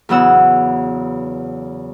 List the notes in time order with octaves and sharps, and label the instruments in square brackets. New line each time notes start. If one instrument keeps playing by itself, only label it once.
[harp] E2 C#3 F#3 B3 F#5 E6